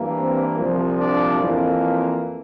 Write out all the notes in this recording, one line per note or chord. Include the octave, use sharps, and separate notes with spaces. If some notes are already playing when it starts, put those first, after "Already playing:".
Already playing: G2 E3 A#3
C4
C2 A#2 F3
D4
F2 E3 A#3